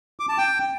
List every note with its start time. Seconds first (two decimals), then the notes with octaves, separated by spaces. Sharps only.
0.20 D6
0.29 A5
0.38 G5